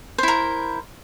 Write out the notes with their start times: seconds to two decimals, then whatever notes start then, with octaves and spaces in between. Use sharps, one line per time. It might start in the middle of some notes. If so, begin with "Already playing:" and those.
0.18 C5
0.23 E4
0.28 A#4